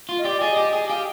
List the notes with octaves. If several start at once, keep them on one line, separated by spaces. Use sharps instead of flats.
F4
D#5
G4 D5
G#4 D#5
G4
G#4
G4 F5